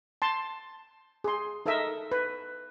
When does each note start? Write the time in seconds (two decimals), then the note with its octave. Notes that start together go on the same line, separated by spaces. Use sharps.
0.22 A5 C6
1.24 G#4 C6
1.66 D#4 A4 A#4 D#5 E5
2.12 B4